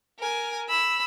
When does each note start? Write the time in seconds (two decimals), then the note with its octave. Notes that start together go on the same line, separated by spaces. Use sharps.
0.19 A#4 G#5
0.69 B5 E6